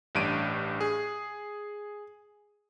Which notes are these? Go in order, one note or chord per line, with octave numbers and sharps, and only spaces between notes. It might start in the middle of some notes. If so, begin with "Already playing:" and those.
A1 G2 D7 D#7
G#4